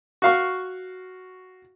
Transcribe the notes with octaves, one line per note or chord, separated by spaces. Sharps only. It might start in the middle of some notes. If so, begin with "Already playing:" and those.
F#4 F5 C#6